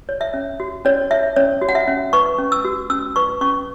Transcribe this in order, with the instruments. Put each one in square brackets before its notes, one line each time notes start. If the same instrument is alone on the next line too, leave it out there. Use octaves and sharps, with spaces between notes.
[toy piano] C#5
E5
C#4
F#4
C#4 C#5
C#5 E5
C#4 C#5
F#4
F#5
E5
C#4
B4 C#6
C#4
E6
F#4
C#4 E6
B4 C#6
C#4 C#6